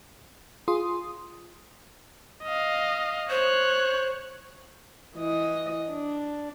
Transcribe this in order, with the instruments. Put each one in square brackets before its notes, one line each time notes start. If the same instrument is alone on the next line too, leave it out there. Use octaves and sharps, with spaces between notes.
[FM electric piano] F4 G#4 C6 D#6
[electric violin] D#5 F5
[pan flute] C5 [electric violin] C#5 F#6
[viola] E3 D#5
D4